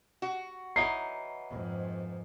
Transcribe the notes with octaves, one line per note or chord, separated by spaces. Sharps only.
F#4
E3 F#3 D#4 C7
F2 G#2